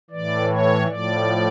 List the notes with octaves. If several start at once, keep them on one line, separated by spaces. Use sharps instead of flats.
A2 E3 D5
C#5
A2 F3 D5